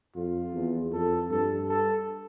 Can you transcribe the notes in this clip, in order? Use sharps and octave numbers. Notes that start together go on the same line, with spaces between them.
F2 F4
E2
F2 A4
G2 A4
A4